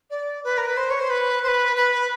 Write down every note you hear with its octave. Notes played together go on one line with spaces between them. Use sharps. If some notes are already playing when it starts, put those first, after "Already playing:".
D5
B4
A#4
B4
C5
C#5
C5
B4
C5
B4
B4